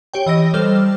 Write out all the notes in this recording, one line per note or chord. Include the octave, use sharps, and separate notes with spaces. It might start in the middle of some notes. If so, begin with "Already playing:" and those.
G4 C#5 G5
E3 D#5 E6 A#6
G3 A4 C5 F6